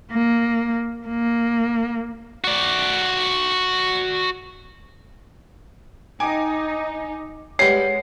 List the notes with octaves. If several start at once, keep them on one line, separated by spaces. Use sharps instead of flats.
A#3
A#3
F#4 D5
D#4 G5 G#5 D6
G3 G#3 G4 B4 C#5 F#5 C7